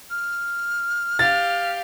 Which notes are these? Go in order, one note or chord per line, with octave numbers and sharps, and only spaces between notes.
F6
G4 F5 A6